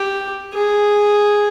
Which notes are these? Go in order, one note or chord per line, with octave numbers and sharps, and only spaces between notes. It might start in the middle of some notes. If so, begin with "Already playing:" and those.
Already playing: G4
G#4